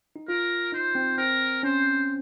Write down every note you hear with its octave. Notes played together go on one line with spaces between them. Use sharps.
D#4
F4 A#4
D#4 C5
C4
C4 A#4
C#4 C5